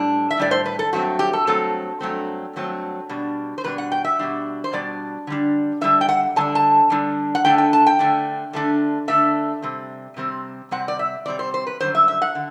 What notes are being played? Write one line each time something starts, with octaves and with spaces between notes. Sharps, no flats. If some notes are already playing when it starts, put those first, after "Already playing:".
Already playing: A2 G3 D4
E5
A2 G3 D4 D5
C5
B4
A4
G2 F#3 A3 C4 F#4
G4
A4
G2 F#3 A3 C4 A4
G2 F#3 A3 C4
G2 F#3 A3 C4
B2 G3 D4
C5
B2 G3 D4 B4
F#5
G5
E5
B2 G3 D4
C5
B2 G3 D4 D5
D3 G3 D4
D3 G3 D4 E5
G5
F#5
D3 G3 D4 A5
A5
D3 G3 D4
F#5
D3 A3 D4 G5
G5
A5
G5
D3 A3 D4
D3 A3 D4
D3 A3 D4 E5
C3 G3 C4
C3 G3 C4
C3 G3 C4 F#5
D5
E5
C3 G3 C4 D5
C5
C5
B4
F#2 D3 G3 C5
E5
E5
F#5
D3